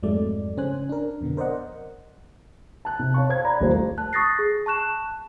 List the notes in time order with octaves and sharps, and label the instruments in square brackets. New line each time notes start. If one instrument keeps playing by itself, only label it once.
[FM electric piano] F2 G#2 F#3 G#3 A3 D5
C#3 C#4 C5 G#5 F#6
D4 A#4
F2 B2 D3 B3
A#4 C5 D5 D#5 F#5
[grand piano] A5 F#6
C3
C#5 F5 A5 C#6
C5 G#6
D5 A#5 B5
D#1 A#2 A3 A#3 G4 C5
[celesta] A5 F#6
C#6 D#6 F#6 A6 A#6 C7
G#4
A5 C#6 F#6 E7